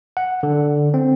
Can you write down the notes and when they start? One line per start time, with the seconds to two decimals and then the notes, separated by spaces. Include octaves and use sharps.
0.17 F#5
0.43 D3
0.94 C4